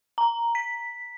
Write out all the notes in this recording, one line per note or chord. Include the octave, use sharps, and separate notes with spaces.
A#5
B6